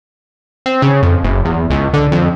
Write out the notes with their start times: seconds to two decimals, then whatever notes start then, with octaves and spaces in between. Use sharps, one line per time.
0.66 C4
0.82 C#3
1.03 F2
1.24 F#1
1.45 E2
1.70 C#2
1.93 D3
2.12 F2